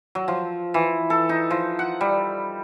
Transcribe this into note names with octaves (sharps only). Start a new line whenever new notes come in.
F#3
F3
E3
A4
D#4
F3
F#5
G3